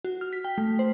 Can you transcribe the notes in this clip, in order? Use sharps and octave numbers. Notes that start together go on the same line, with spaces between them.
F#4
F6
B6
G5
A3
C5